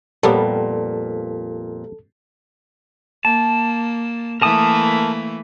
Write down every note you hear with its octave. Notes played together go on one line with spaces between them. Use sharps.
F2 A#2 G3 B3 G4 A4 A#4 C#5
A#3 A5
E3 A3 A#3 A#4 A5 D#6